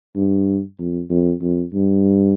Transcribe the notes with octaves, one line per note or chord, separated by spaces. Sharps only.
G2
F2
F2
F2
G2